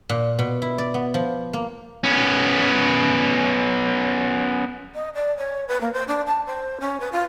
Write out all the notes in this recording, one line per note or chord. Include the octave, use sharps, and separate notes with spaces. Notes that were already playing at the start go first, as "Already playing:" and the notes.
A#2
B2
E4
D5
B3
F3
A#3
B3 C#4
D#5
D5
C#5
B4
A#3
C5
D4
A5
C5
C#4
B4
F4